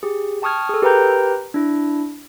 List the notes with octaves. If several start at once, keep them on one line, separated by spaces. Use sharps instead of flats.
G4 G#4
G5 A5 C#6 D#6 F6 G#6
G#4 A4
G4 A#4 B4 G5 A#5 G6
D4 E4